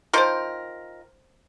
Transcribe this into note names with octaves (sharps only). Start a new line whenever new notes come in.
D#3 F3 A#4 C5 C6